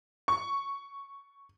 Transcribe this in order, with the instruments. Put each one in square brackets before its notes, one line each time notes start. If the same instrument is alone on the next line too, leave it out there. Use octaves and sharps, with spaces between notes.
[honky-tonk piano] C#6